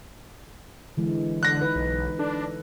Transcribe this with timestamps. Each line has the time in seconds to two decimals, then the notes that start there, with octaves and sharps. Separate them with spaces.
0.97 D3 E3 G#3
1.43 D3 F#6 A#6
1.61 D#4 B4
1.75 B1
2.19 D4 A4